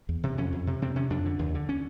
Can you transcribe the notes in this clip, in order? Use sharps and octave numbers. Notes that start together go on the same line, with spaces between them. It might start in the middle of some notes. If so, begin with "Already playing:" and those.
E2
C3
F2 C#4
F2
C3
C3 C4
C3 C#4
F2 D4
D3
D#2
D3
C#4